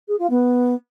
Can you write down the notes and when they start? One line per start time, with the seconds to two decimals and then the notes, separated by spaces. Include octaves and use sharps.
0.08 G#4
0.19 F4
0.30 B3